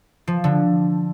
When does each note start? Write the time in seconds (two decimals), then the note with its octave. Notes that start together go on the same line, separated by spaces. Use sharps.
0.27 F3
0.44 D3